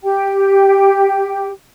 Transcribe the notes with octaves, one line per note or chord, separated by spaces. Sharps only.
G4 G5